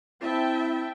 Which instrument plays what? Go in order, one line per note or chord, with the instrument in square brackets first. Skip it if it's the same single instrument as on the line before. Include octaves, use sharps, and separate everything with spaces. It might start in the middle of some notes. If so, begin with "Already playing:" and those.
[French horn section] C4 E4 [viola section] E5 G5 A5